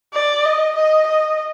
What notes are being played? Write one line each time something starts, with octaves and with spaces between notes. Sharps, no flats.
D5
D#5
D#5
D#5